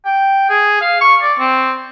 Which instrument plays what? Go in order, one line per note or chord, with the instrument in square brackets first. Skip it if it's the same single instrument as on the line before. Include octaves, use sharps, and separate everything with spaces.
[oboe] G5
G#4
F5
C#6
D5
C4